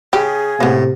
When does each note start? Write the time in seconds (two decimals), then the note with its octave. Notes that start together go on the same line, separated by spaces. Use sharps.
0.13 C#3 G4 G#4
0.61 A2 C3 A#3 B3